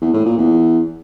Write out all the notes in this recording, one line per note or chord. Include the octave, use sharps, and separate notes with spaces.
E2
A2
A#2
E2